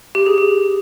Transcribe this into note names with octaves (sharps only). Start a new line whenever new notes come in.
G4
G#4
G4